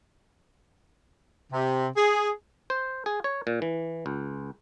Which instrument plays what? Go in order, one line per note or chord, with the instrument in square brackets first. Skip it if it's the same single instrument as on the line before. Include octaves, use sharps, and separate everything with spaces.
[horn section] C3
G#4
[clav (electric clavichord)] C5
G#4
C#5
A#2
E3
C#2